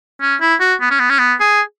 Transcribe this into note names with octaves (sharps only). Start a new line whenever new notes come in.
C#4
E4
F#4
B3
C#4
B3
C#4
B3
G#4